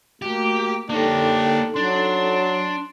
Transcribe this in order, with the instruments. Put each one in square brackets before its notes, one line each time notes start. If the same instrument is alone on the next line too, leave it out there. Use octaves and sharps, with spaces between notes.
[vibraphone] A3 F#4 D6 [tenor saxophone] A#3 [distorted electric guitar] G4
[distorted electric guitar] A#3 C#5 [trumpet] D4 [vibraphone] D#4 A4 [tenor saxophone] G4
[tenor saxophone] F#3 [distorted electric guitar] D4 [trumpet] C6